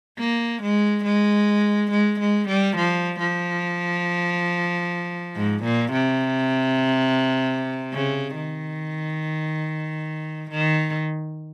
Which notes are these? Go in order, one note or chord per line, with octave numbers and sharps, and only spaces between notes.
A#3
G#3
G#3
G#3
G#3
G3
F3
F3
G#2
A#2
C3
C#3
D#3
D#3